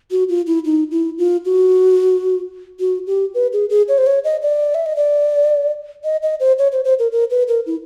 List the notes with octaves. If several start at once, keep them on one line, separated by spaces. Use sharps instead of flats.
F#4
F4
E4
D#4
E4
F4
F#4
F#4
G4
B4
G#4
G#4
C#5
C5
C#5
D#5
D5
E5
D#5
D5
D#5
D#5
C5
C#5
C5
C5
A#4
A#4
B4
A#4
E4